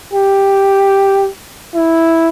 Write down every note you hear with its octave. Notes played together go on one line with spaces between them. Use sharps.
G4
E4